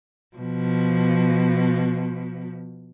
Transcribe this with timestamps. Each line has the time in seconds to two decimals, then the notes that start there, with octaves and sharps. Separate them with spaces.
0.37 B2 F3